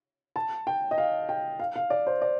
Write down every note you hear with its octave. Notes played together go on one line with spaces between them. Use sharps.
A5
G5
D#5
F5
G5
F5
F5
D5
C5
D5